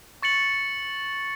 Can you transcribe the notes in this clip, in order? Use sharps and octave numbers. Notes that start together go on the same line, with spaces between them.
C#6 A6 C#7 F#7